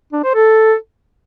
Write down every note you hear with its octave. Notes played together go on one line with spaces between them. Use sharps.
D4
C5
A4